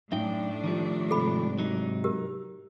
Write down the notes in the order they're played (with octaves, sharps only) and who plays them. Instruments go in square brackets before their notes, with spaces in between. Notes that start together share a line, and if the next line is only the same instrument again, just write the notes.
[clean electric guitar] F#2 D#4 G5 [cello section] A2 D4 [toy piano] E5
[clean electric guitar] D#3 F3 G3
[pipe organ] G#2 C3 [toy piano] A4 B5
[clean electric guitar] F#3 D#4
[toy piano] G4 A#4